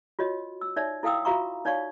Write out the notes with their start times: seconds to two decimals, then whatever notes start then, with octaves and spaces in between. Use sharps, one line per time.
0.19 F4 F#4 C#5 D#5
0.61 E6
0.76 D#4 C#5 D5 E5
1.03 E4 A4 F5 G5 D#6 E6
1.25 F4 F#4 E5 F5 A#5 C#6
1.65 D#4 C#5 D5 F5 C#6